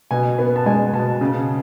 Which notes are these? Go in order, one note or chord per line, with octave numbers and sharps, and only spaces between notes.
B2 G#5
B3
A5
G#3 G#5
B2 A5
C#3